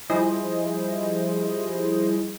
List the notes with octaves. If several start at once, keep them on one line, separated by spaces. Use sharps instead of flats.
F3 G3 E4 G#4 C5 D#5